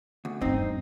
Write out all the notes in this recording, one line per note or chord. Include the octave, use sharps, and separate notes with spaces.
D2
E2 G2 C4 D#4